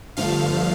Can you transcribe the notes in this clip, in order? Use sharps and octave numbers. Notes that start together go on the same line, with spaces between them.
G2 D3 F3 A3 F5